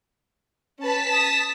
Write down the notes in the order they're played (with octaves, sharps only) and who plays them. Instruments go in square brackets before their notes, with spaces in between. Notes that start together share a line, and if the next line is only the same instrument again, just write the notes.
[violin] C#4 B4 [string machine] A5 B6
[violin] D#6 E7